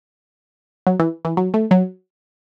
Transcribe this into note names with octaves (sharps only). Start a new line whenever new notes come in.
F#3
E3
E3
F#3
A3
F#3